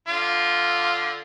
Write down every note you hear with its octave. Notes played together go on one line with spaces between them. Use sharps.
D3 F4